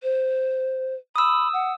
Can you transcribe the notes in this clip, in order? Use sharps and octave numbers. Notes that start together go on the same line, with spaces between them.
C5
B5 D#6 E6
F#5